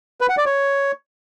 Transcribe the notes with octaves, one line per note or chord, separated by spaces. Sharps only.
B4
F#5
D5
C#5